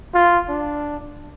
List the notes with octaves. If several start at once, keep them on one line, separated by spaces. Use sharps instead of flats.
F4
D4